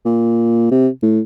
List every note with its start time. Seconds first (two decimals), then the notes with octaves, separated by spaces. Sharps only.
0.05 A#2
0.71 C3
1.03 A2